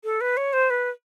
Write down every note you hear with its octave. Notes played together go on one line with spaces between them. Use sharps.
A4
B4
C#5
C5
B4